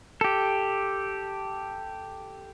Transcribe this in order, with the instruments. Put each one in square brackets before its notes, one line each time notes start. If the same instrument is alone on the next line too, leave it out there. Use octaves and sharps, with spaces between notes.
[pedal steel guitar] G4 A4